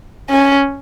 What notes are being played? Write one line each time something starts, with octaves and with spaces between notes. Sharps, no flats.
C#4